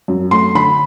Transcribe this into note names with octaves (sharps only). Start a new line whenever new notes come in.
F#2
A3 C6
D3 B5